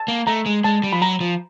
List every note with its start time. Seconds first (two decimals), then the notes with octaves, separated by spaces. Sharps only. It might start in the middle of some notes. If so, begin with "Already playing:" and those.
Already playing: A5
0.08 A#3
0.27 A3 A#5
0.46 G#3
0.64 G#3 A5
0.84 G3
0.92 F3 B5
1.02 F#3 A#5
1.20 F3